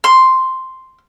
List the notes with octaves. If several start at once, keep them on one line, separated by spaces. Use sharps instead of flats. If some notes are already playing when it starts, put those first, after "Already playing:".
C6